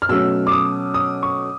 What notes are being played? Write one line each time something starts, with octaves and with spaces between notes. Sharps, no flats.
F6
B2 F#3 A3 C#4 E6
D6
D#6
D#6
C#6